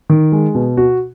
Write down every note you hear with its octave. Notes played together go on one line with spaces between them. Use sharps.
D#3
G#3
B2
F#4